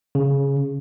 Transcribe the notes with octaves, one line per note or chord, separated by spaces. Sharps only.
C#3